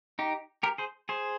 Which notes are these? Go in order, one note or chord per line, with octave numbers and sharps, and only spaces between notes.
D#4 G4
G4 A#4
G#4 C5
G#4 C5